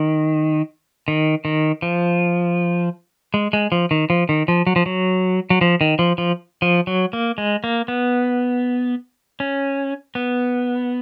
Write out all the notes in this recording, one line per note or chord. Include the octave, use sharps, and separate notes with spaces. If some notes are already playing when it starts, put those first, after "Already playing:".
Already playing: D#3
D#3
D#3
F3
G#3
G#3
F3
D#3
F3
D#3
F3
F#3
F3
F#3
F#3
F3
D#3
F3
F3
F3
F#3
A#3
G#3
A#3
B3
C#4
B3